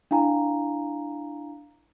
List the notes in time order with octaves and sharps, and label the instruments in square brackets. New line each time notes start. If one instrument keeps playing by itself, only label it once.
[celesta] D4 E4 F5 G#5 A#5